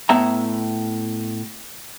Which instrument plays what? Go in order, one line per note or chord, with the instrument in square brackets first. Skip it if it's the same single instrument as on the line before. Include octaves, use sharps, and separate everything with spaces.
[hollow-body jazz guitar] A2 B3 E5 A#5